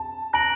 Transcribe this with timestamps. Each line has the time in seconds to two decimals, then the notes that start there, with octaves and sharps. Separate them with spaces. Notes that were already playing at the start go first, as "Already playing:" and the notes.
Already playing: A5
0.33 A#5 F#6 A#6 D7 F#7